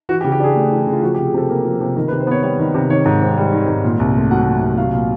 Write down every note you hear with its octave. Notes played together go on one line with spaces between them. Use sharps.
E3 F#4
G4
C#3
G4
D4 G#4
A3
E3
C#3
F4
F3 F#4
G4
C3
G#4
C3 A4
A#3 A#4
F3
C3
D#3 A#4
B4
C3
C5
B3 C#5
G3 C#5
D#3
C3
D#3 C#5
G#2
C4
G3
D#3
G#2
A#2
C2
A3
F#3 F#5
A#2
C2
F#3 F5
A#2